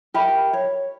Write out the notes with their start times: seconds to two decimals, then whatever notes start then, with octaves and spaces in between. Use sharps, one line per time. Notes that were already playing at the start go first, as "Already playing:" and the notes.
0.14 G4 A#4 E5 B5
0.53 C#5